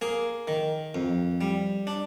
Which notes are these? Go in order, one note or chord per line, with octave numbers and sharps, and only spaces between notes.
A#3 G#4
D#3
F2
G3
D4